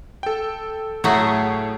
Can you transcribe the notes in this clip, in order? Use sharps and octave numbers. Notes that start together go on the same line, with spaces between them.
A4 G5
A2 F#3 A3 G#4